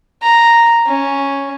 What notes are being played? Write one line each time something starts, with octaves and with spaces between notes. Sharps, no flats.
A#5
C#4